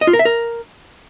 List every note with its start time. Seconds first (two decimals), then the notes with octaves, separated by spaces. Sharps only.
0.01 D#5
0.07 F4
0.13 A#4
0.19 E5
0.25 A#4